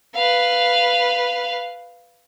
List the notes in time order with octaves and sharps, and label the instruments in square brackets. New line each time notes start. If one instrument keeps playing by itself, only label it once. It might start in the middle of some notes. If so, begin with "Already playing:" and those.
[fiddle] B4 F5